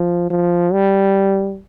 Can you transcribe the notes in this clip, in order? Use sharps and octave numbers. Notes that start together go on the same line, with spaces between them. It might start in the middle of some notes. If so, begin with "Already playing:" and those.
Already playing: F3
F3
G3